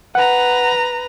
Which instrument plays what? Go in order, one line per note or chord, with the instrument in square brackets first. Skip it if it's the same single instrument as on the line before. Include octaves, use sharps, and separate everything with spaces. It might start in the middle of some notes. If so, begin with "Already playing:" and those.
[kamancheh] B4 A#5 [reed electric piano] F#5